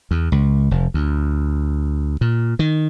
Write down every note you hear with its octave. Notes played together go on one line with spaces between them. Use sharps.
E2
C#2
F1
D2
A#2
D#3